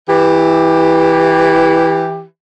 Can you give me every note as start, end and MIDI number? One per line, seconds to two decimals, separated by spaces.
0.08 2.23 52
0.08 2.23 67